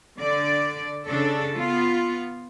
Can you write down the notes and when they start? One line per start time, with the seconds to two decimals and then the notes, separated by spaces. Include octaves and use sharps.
0.18 D3 D5
1.06 C#3 D4 A4
1.55 B3 F4